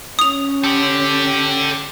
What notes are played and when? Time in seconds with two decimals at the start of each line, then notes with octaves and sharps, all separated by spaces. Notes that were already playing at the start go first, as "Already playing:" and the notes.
0.19 C#4 D#6 F7
0.64 G4 A4 D5